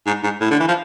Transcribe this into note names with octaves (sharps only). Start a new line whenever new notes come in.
G#2
G#2
A2
D3
E3
F3